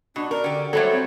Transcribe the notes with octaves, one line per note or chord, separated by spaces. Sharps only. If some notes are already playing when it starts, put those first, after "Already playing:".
B2 D4 F#4
A#4 D5
D3 G4
F#3 G3 A3 A4 C5 C#5
C4